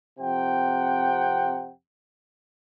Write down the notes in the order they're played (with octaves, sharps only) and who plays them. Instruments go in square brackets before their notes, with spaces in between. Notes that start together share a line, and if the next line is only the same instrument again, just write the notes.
[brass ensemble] F2 C3 F#5 G5